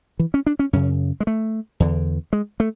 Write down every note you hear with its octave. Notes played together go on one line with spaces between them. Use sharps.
E3
C#4
D4
C#4
F#2 C#3 C#4
G#3
A3
E2 D3
G#3
A3